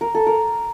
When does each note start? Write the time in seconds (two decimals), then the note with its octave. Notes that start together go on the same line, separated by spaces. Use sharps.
0.01 A#4
0.15 A4
0.27 A#4